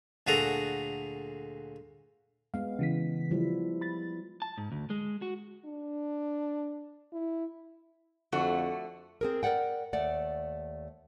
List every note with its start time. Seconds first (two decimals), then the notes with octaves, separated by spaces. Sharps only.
0.27 D2 A#2 F#4 G#4 A4 A#5
2.54 G#3 B3 F5
2.79 C#3 E3 B6
3.31 F3 G3 E4
3.81 B5 A6
4.42 A5
4.58 G#2
4.72 D2
4.90 G#3
5.22 F#4
5.65 D4
7.13 E4
8.32 F2 D3 A3 F#4
9.21 C4 G#4 A#4
9.43 A#4 C#5 D5 F#5 G5
9.93 D#2 A3 D5 F#5